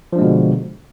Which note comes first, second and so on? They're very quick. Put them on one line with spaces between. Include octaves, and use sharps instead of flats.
F3 D4 G#3 B2 D3